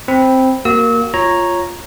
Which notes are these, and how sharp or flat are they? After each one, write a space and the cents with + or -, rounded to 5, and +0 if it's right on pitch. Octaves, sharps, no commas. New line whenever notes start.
C4 +0 B5 +0
A#3 +0 F#4 +25 E6 -35
F4 +0 C#5 -5 A#5 +0